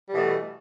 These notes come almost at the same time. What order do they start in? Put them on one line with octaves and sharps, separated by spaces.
G3 B2 E3 A3